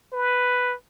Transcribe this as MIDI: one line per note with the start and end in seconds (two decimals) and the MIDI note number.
0.13 0.74 71